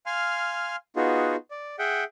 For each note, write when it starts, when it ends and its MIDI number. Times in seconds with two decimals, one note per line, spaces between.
0.06 0.76 77
0.06 0.76 80
0.06 0.76 84
0.06 0.76 89
0.96 1.36 59
0.96 1.36 63
0.96 1.36 65
0.96 1.36 66
0.96 1.36 68
1.51 1.76 74
1.79 2.04 68
1.79 2.04 76
1.79 2.04 78
1.79 2.04 79